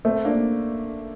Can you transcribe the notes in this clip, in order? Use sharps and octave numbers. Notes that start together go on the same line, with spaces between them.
A3 C4
A#3 D4